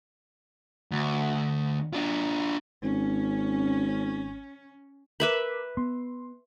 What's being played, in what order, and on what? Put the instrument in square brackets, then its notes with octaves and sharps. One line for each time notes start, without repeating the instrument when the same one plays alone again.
[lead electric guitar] D2
D4 F4
[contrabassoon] G#1 [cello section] C#4
[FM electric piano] A#4 D6 [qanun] B4 E5 B5
[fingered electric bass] B3 [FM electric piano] C6